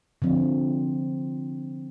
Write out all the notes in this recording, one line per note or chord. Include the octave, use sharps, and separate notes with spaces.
D3 F3 C4